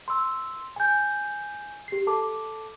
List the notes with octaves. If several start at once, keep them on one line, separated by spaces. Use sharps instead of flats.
C6 E6
G#5 G6
G4 C7
A4 A5 D6